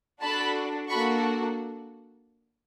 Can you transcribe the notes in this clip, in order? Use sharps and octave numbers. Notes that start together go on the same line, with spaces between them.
D4 F#4 A4 A5 B5
A#3 D4 F#4 A4 B5 C#6